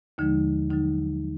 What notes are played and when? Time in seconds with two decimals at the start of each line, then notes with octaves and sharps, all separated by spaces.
0.18 D#2 D3 F3 G#3 D#4
0.70 D#2 D3 F#3 D#4